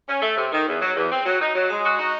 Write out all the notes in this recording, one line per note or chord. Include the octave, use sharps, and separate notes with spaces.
C#4
A3
C3
D#3
E2
F#3
E2
C4
F#3
D#4
F#3
G#3
F#4
D#4